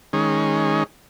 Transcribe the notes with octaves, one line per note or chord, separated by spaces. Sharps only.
D#3 G#3 C#4